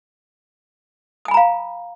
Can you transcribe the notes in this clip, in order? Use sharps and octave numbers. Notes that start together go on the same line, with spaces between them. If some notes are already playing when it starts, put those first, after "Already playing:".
F5 G#5 A#5 B5 D#6